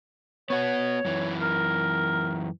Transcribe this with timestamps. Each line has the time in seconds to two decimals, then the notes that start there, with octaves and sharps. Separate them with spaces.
0.50 B3 F#4 C#5
1.05 F#2 E3
1.40 A#4